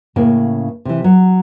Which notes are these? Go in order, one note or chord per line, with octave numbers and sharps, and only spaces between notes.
A2 C#3 A#3
C3 E3
F#3